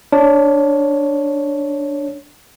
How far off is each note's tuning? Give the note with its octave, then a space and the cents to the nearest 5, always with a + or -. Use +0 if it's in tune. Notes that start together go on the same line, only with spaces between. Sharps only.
D4 +0 C#5 +0